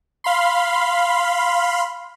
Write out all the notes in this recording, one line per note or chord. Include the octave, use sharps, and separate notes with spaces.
F5 B5 C6